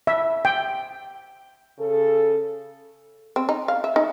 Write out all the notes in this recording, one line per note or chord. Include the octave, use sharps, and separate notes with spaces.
E5
G5
C#3 A4
C4
D#4
F5
E5
D#4